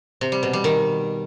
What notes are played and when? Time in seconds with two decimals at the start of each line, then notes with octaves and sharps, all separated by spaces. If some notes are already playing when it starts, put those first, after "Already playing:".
0.21 C3
0.32 G3
0.43 B2
0.53 G3
0.64 D#3